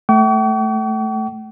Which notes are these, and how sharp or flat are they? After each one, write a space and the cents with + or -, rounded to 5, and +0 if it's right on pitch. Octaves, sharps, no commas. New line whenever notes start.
A3 -5 G5 -45 C#6 +45